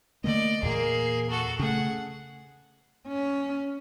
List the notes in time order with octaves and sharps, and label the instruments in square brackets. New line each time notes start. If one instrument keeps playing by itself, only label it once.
[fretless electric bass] D3 A3 A#3 [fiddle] D5 D#5
[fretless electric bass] E2 A#2 [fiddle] A#3 G#4
[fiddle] F#4 A4
[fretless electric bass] C#3 A3 [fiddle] G#4 F#5
[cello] C#4